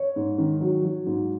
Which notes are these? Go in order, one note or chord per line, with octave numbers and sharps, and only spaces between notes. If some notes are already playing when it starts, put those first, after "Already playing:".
Already playing: C#5
G#2
D#3
F#3
F#3
G#2